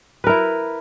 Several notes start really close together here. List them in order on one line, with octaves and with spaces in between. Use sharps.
B4 A#4 E4